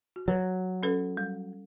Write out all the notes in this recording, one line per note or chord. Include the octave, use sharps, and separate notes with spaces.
F#4
F#3 B4
C#4 A4 B4
G3